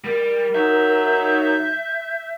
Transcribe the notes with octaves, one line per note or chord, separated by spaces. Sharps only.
G3 A#4
F#3 D#4 E5 G6